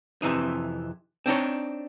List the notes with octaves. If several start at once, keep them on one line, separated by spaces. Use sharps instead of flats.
F2 C3 E3 D#4
C4 D4 D#4 C#5